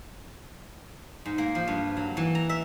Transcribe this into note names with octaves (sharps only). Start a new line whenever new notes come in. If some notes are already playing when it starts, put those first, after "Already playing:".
G#2
A#3
F3
G2
F#3
E3
A#5
E5